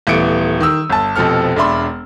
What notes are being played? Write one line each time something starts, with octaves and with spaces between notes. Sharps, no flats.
D#1 E3 A3 B3 C#7 D7
D#3 D#6 E6
G1 A5
F1 B2 F3 C4 A4 F6
E1 D4 E5 B5 C6